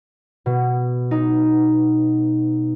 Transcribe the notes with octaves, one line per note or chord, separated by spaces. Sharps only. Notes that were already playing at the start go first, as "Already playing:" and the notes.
B2
D#4